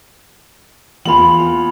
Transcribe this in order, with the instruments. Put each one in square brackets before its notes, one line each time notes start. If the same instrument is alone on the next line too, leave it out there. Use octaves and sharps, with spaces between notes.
[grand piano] E2 F4 F#7 [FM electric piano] E3 A#3 C6 [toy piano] G5 B5